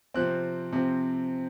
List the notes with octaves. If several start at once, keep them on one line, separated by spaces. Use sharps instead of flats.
C3 F3 C4 F#6
C3 F3 C4